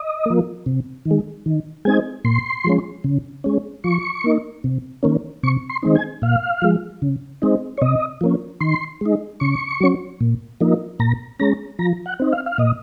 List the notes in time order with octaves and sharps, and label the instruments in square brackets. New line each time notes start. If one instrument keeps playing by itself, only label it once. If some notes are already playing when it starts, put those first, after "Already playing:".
Already playing: [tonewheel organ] D#5
F3 A#3
C3
D#3
G#3
D#3
G#3 C4 D#4 G#5
A#2 C6
F3 G#3 C#4
C#3
G#3 C#4
F3 C#6
A#3 D#4
C3
D#3 A#3 C#4
C3 C#6
C6
D#3 G#3 C4 D#4
G#5
A#2 F5
F3 G#3
C#3
G#3 C4 D#4
C#5
C3 D#5
F3 A#3 C#4
D#3 C6
G#3 D#4
C#3 C#6
F#3 C#4
A#2
F3 A#3 D#4
A#2 A#5
G#3 C#4 A#5
F3 A#5
F#5
C4 D#4
F5
F5
A#2 D#5